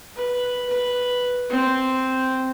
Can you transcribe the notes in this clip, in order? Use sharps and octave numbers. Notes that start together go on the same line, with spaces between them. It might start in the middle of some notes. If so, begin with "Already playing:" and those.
B4
B4
C4